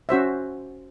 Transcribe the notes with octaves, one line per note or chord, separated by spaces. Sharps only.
C#4 F#4 C5 E5